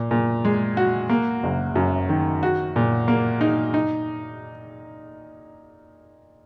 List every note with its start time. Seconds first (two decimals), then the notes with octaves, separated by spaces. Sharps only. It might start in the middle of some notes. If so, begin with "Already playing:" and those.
Already playing: A#2
0.11 A#2
0.45 G#3
0.77 F#4
1.09 A#3
1.43 F#1
1.76 F#2
2.09 D#3
2.43 F#4
2.76 A#2
3.08 A#3
3.41 D#4
3.74 D#4